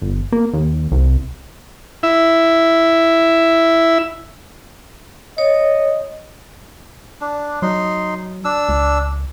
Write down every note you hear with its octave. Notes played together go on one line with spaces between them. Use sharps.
G1
A#3
D#2
C2
E4 E5
C#5 D#5
D4
F#3 D#4 C6
D4 E6
C#2